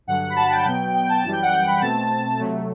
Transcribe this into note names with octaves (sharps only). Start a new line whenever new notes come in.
G2 D3 F#3 F#5
B5
A5
G5
B2 F#3 B3 G5
G5
A5
F#2 E3 G3 A5
G5
F#5
G5
B5
B2 A3 C4 A5
C3 F#3 A3